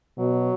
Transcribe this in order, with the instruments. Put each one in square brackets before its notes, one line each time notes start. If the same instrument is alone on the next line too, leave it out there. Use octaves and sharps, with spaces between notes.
[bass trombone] B2 [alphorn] F#3